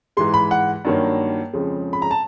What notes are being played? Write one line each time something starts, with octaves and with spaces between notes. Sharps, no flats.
G#2 E3 G#3 C6
B5
F#5
G2 D#3 F#3 A#3
F2 C#3 F3 G#3
B5
A#5
A5